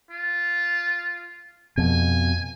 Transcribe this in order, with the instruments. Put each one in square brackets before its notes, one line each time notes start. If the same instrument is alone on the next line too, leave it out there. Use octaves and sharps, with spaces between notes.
[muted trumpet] F4
[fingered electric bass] F2 B2 [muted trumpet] G#5